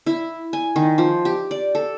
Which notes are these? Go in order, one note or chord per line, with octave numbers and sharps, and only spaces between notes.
E4
G#5
D#3
F3
G4
D5
A4